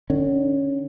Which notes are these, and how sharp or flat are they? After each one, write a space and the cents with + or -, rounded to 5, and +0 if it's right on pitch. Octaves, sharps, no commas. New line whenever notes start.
D3 +35 C#4 +0